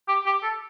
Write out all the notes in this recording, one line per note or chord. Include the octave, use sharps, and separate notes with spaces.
G4
G4
A4